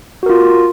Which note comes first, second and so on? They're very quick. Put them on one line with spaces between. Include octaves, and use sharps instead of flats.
F#4 A#4 F4